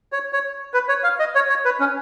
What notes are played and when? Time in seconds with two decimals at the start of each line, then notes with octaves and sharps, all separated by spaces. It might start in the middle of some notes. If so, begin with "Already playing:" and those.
0.12 C#5
0.33 C#5
0.74 B4
0.89 C#5
1.03 F5
1.19 D#5
1.35 C#5
1.49 C#5
1.65 B4
1.80 C#4